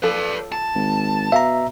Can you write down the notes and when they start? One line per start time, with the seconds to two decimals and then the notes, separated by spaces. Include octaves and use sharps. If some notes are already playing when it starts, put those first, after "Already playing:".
0.03 F3 A4 B4 D5
0.52 A5
0.75 G#1
1.32 B2 E5 F5 A#5